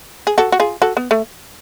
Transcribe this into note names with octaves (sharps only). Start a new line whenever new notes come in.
G#4
F#4 A4
F#4
F4 G#4
F#4 A4
B3
A3